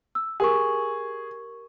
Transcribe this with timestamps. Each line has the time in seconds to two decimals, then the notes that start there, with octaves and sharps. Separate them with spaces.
0.15 E6
0.40 G4 G#4 A#4 C#6